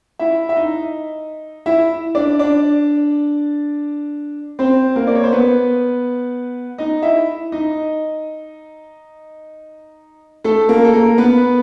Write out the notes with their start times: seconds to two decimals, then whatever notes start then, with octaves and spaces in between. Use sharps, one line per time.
0.19 E4 E5
0.49 E5
0.56 D#4 D#5
1.66 E4 E5
2.15 D4 D5
2.39 D4 D5
4.59 C4 C5
4.96 A#3 A#4
5.07 D5
5.15 C#5
5.23 C5
5.32 B3 B4
6.78 D#4 D#5
7.03 E4 E5
7.52 D#4 D#5
10.44 A3 A4
10.69 A#3 A#4
10.84 A4
10.93 A#3 A#4
11.18 B3 B4